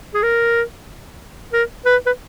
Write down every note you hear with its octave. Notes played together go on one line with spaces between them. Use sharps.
G#4
A#4
A#4
B4
B4